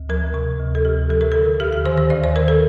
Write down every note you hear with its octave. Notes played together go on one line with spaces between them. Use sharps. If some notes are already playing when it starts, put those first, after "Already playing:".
Already playing: D2
F3 A#4
C3 A#4
D2
A4
D2 G4
F3 A4
A#4
D3 A4
D#2 G4
G4
D#3 C5
C5
D#2 D5
C5
D#3 A#4
A4